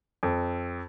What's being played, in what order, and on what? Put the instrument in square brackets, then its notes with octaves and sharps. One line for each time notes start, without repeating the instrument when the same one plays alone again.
[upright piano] F2